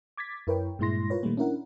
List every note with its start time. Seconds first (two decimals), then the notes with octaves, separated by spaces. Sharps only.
0.17 D6 G#6 A6 B6
0.47 F#2 E4 A#4 B4 C#5 G5
0.79 G2 A#2 G#3 E4 C6 A#6
1.10 F4 A#4 B4 C#5
1.23 A#2 D#3 G3 A3 A#3
1.37 C#4 D4 E4 A#4 F#5